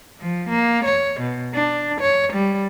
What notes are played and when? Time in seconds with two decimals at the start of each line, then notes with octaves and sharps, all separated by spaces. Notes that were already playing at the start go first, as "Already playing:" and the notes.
0.21 F3
0.49 A#3
0.84 C#5
1.20 B2
1.54 D4
2.00 C#5
2.33 G3